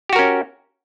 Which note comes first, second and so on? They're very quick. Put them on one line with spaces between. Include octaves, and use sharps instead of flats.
G4 F#4 A#4 C#4